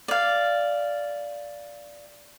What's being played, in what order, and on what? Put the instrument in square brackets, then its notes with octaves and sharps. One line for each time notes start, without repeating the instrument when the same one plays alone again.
[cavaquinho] D5 F5